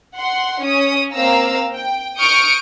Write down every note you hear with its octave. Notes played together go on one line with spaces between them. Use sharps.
F#5 C6
C#4 D#6
A#3 C4 F5 A#5 E6
G5
C#6 D#6 F6 G6 C#7 D7